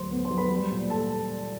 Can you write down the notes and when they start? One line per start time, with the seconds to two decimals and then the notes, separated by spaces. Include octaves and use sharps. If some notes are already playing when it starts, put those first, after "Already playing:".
Already playing: D2 F#3 C5 C6
0.11 B3
0.25 C5 C6
0.31 F#3
0.38 B4 B5
0.50 G3
0.71 A#2
0.90 A4 A5